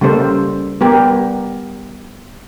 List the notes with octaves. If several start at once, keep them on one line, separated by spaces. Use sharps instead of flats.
C#3 G3 A#3 A4 C5
G3 B3 G4 A#4